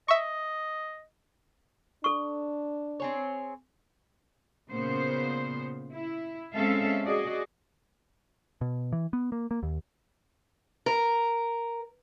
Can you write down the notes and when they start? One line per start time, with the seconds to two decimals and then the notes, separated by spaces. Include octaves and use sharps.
0.08 D#5 E5 C#6
2.04 D4 A4 C#6
3.00 C4 G#4 C#5
4.71 A#2 C#3 B3 C5
5.93 E4
6.53 G#3 C4 C#4 A4 E5 F5
7.05 F#4 G#4 D5 D#5
8.61 B2
8.92 E3
9.13 B3
9.32 A#3
9.51 A#3
9.63 D#2
10.86 A#4